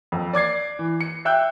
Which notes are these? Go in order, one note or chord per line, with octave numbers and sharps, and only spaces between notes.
F2
D5 D6 G#6 C7
E3
C#7
E5 G5 E6 F#6 G6